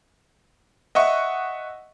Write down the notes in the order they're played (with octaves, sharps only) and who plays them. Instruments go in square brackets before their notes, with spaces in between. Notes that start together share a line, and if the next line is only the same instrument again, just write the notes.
[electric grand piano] D#5 E5 F#5 C#6